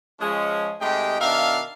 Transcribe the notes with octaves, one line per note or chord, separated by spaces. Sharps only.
F3 G#3 C#4
C3 G#3 A3 D#4 G4 G5
B2 D#3 D4 E5 F5